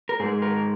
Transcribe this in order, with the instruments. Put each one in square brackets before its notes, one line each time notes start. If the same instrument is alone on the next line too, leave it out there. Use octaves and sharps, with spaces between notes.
[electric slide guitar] A#4
G#2 G#3 G#4
A#4